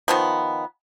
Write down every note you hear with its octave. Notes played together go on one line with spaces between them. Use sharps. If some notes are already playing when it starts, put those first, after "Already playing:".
D#3 F3 B3